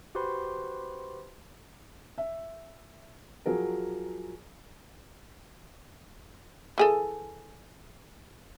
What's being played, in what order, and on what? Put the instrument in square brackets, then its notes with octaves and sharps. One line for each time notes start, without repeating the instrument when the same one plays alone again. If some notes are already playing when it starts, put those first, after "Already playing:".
[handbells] F#4 G4 B4 C5 B5 C6
[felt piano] E5
F3 F#3 G#4 A#4
[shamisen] E3 G#4 A4